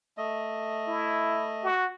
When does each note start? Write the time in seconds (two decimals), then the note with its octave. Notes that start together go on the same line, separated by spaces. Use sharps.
0.18 A3 D#5
0.87 E4
1.64 F#4